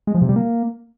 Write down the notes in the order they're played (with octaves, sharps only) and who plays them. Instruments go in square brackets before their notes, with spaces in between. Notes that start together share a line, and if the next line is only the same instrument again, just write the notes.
[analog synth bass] G#3
F3
C3
G3
A#3